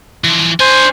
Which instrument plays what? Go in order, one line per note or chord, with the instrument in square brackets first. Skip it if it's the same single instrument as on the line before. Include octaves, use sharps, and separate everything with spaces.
[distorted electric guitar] E3 F3
[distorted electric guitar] D4 G#5 [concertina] C5